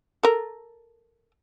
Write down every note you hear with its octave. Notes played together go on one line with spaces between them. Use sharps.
A4 A#4